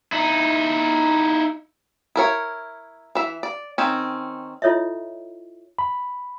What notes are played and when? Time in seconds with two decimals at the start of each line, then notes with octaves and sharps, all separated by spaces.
0.12 D#4 E4
2.16 E4 A#4 C#5
3.15 E3 E5
3.43 D5
3.78 D#3 C4 C#4
4.62 E4 F4 A4 C#5 D#5 E5
5.79 B5